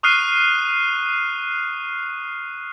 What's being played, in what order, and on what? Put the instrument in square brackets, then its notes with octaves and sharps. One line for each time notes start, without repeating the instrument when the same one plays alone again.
[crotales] C#6 D#6 F6 F#6 C7 D#7